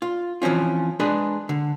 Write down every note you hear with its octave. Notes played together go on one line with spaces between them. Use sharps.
F4
E3 F3 C4 C#4 F4
G#3 D4 G#4 B4
D3